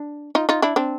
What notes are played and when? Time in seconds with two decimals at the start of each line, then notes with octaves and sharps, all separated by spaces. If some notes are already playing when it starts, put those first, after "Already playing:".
Already playing: D4
0.35 D#4 F4
0.49 D#4 F4
0.62 D4 E4
0.76 C4 D4